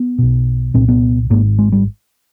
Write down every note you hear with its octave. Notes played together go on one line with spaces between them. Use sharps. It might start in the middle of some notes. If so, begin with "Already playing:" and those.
Already playing: B3
B1 B2
C2 A#2 C4
B3
G#1 G#2 A#3
G#3
G3